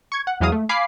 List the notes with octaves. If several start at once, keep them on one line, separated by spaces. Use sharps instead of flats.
C#6 G#6
F#5
E2 E3 F#3 G#3 F5 D#6
A3
F5 G#5 B5 D6 C7